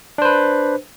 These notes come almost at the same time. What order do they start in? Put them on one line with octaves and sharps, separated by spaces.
D4 C5 B4